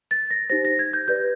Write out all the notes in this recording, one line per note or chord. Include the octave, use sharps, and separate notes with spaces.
A6
A#6
D#4 G4 C5 A#6
A#6
G#6
G6
G4 B4 D5 G6